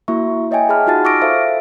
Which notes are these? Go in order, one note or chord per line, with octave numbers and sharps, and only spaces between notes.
A#3 E4 F#4 E5 C#6
C#5 D#5 E5 G5 G#5
G#4 A5 B5 F6
D#4 F4 F#4 F#5 A5 A6
C#6 D6 E6 F6 A#6 D7
A4 C5 E5 F5